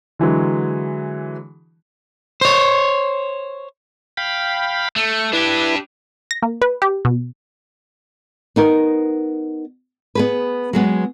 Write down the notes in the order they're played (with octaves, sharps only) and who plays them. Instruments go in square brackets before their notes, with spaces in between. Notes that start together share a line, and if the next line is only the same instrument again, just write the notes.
[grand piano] D3 E3 F#3 G#3
[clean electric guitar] C5 C#5
[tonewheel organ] F5 G5 B5
[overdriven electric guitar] A3
[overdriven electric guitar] D4 G4 [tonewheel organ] E4 B4
[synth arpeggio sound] A#6
A#3
B4
G4
B2
[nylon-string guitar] B3 D#4 A#4
B3 G#4 B4
F#3 G#3 B3